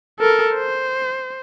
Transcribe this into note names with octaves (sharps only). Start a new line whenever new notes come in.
A4 A#4
C5